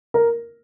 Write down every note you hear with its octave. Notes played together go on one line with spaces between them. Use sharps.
A#4